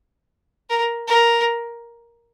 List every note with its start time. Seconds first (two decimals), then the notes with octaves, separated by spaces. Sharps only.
0.70 A#4
1.07 A#4